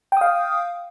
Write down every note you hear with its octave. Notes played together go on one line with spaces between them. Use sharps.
F5 G5 D#6